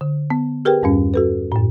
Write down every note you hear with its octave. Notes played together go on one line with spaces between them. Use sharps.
D3
B3
G4 G#4 A#4 B4 G5
E2 G2 G3 C#4
F#4 A4 B4
F#2 A2